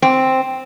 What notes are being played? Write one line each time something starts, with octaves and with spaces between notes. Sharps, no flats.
C4